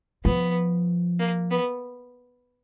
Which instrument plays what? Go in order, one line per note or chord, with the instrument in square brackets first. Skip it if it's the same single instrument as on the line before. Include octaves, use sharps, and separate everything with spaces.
[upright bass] F3 [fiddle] B3
[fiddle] A#3
B3